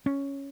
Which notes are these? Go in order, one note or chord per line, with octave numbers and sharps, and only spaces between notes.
C#4